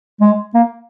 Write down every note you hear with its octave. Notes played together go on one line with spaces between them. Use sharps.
G#3
A#3